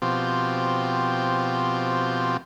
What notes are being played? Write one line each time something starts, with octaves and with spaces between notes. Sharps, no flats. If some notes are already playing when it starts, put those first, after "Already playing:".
B2 F3 C4 F4 G4